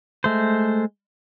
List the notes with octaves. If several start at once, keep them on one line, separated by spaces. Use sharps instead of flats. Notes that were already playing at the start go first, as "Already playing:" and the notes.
G#3 A3 C5